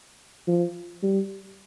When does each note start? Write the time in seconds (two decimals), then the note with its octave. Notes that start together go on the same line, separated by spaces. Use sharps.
0.47 F3
1.03 G3